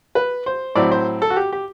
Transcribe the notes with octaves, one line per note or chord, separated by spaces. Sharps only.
B4
C5
A2 F#3 C4 E4 D5
C5
A4
F#4
G4
G4